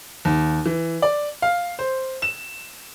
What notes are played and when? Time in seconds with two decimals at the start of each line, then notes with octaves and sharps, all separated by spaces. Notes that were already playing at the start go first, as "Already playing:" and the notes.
0.25 D#2
0.66 E3
1.02 D5
1.42 F5
1.79 C5
2.22 E7